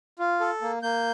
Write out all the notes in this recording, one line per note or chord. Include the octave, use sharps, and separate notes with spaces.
F4
A4
A#3
A#3 G6